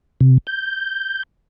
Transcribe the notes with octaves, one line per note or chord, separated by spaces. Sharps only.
C3
G6